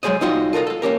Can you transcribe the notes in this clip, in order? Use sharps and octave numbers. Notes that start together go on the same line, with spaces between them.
F#3 G#3 G#4 C5 C#5 D#5
C2 D#4 F4 F#4 D#5 G5
F4 A4 A#4 D#5 F5
A4 F5
A#3 C#4 G4 A#4